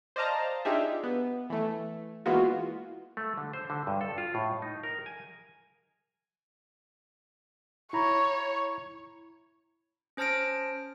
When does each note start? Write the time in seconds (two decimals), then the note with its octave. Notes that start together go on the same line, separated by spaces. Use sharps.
0.16 C5 D5 D#5 F5 A5 A#5
0.65 D4 D#4 F4 G4 G#4 E5
1.04 B3
1.50 E3 A3
2.26 E3 G#3 A#3 B3 F4 F#4
3.17 A3
3.38 D3
3.53 C5
3.70 D3
3.87 G2
4.01 A4
4.18 F4
4.35 A2
4.62 D#4
4.83 A#4
5.06 G#5
7.93 E4 C#5 A#5 B5
10.17 C#4 C5 A5 F6 A#6 D7